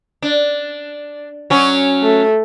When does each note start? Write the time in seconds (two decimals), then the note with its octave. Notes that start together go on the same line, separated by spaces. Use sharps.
0.22 D4
1.50 F#3 C#4
2.03 A3